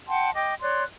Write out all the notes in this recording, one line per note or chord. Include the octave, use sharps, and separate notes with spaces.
F#5 G5 A5 C6
D#5 G5 D6
C#5 D5 C6 F#6